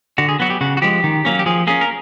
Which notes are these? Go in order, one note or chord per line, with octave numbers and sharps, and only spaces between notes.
D3 F#4
G#4
F#3 B3 F#4
G4
C#3 F#4
F#4
F3 G#3 G4
D#3
F#3 A#3 C#4
G4
F3 G#4
A#3 C#4 G#4
A#4